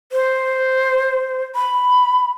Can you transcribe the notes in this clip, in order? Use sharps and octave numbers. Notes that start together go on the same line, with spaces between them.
C5
B5